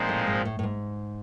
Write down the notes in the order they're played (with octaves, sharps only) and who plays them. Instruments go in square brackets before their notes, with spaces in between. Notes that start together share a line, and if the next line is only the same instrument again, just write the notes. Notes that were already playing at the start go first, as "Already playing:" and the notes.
Already playing: [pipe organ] A#2 F3 G#3 C4 D#4
[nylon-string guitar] A2
G#2
A2
A2
G#2